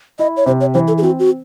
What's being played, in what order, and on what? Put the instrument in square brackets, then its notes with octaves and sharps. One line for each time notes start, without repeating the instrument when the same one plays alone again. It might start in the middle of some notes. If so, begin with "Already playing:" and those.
[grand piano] E4 [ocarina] D#5
[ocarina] C#5
[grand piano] C3 [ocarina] C5
[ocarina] C#5
[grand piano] E3 [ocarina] C5
[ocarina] A4
G#4
[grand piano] C4 [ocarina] F#4
[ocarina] F#4